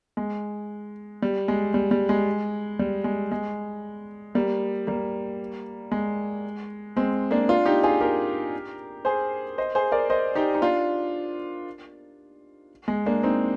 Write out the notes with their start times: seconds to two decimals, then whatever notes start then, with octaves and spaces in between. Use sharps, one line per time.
0.17 G#3
1.22 G3
1.48 G#3
1.74 G3
1.91 G3
2.09 G#3
2.79 G3
3.04 G#3
3.31 G#3
4.35 G3 A#3
4.87 G3 A#3
5.92 G#3
6.96 G#3 C4
7.31 A#3 D4
7.49 D4 F4
7.66 D#4 G4
7.83 F4 G#4
8.01 G4 A#4
9.05 G#4 C5
9.58 C5 D#5
9.75 G#4 C5
9.92 A#4 D5
10.10 C5 D#5
10.35 D#4 G4
10.55 D#4
10.62 D4 F4
12.88 G#3
13.06 A#3 D4
13.23 C4 D#4